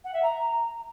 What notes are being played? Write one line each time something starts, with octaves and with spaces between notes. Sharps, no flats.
F#5
E5
A#5